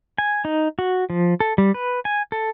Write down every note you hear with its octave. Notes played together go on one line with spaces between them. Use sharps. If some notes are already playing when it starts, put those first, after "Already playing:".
G#5
D#4
F#4
F3
A4
G3
B4
G#5
A4